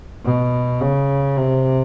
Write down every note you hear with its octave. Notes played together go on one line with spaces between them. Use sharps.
B2
C#3
C3